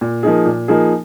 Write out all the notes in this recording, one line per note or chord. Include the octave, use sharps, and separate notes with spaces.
A#2
F3 A#3 D#4 G#4
A#2
F3 A#3 D#4 G#4